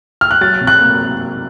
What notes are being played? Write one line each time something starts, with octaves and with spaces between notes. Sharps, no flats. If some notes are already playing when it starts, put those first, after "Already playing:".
F6
F#6
F#3 A6
C3
F#6
A#3